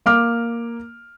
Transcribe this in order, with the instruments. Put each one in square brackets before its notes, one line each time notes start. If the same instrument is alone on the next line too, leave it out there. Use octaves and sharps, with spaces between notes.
[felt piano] A#3 D6 F6